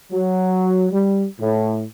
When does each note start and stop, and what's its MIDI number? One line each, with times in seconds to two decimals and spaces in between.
0.12 0.88 54
0.92 1.24 55
1.40 1.83 45